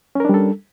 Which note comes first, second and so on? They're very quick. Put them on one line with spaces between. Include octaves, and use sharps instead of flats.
C#4 A#4 D4 G3 A4